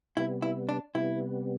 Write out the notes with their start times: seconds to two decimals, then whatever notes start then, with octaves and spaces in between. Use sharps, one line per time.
0.17 C3 G3 B3 E4
0.42 E4
0.69 D4
0.95 C3 G3 B3 E4